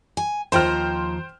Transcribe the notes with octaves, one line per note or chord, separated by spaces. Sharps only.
G#5
D#2 F3 C5 G5 A#5 F6